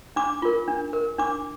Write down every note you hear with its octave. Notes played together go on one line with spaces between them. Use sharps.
D4 D6
F4 A#4
D4
A#4
D4 D6